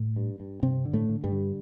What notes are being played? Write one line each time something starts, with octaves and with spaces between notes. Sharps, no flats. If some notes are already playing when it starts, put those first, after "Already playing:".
Already playing: A2 A3
G2
G2
G2 C3 C4
D3
A2 A3
D3
G2 G3
D3